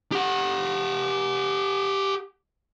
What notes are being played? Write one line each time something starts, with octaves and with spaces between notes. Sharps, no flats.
G4 F#5